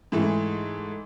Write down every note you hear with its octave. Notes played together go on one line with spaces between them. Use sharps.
G#2 E3 A3